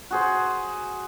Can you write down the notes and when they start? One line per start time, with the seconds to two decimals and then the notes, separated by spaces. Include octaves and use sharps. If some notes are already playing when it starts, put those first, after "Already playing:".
0.11 F#4 G#4 C5